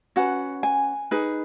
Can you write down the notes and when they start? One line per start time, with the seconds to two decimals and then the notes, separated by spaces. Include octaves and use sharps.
0.16 C#4 F#4 B4 F#5
0.63 G#5
1.11 D#4 G#4 B4